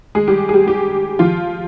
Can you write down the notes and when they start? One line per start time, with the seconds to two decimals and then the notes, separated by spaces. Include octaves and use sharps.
0.15 G#3 G#4
0.28 G3 G4
0.49 G#4
0.53 G3 G4
0.67 G3 G4
1.19 F3 F4